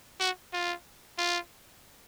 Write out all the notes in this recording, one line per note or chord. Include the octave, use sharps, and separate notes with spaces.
F#4
F4
F4